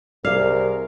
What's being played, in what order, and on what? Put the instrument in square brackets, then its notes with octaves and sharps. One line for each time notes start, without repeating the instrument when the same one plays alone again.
[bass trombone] C2 [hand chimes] G#4 D5 [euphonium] A#4 [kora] F5